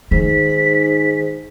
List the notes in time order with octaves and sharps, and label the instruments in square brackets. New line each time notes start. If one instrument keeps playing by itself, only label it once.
[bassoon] G#2 [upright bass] D#3 [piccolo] B6